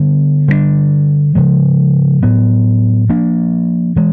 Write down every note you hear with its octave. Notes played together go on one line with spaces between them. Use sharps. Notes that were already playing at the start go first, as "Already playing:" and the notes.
Already playing: D3 G3 B3 D4
D3 G3 B3 D4
C#3 F3 G#3
A2 F#3 B3
F3 A#3 D4
E3 G#3